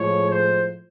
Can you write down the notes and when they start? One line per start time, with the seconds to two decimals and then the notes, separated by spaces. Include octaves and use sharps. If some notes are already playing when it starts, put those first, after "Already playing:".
Already playing: A2 F3 G#3 C#5
0.29 C5